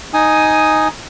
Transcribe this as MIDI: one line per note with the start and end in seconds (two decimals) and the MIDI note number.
0.14 0.88 63
0.14 0.88 80
0.14 0.88 87